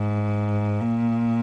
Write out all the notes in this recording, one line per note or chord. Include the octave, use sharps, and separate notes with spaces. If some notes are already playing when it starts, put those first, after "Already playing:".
Already playing: G#2
A#2